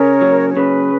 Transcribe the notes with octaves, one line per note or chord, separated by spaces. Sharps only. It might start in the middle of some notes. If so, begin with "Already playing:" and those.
Already playing: C#3 A#4 C#5
F#3
C#5
C#3 B4